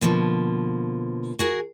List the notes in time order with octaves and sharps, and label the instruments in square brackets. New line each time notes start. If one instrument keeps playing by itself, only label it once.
[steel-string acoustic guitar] B2 D3 F3 A#3
F#4 G#4 A#4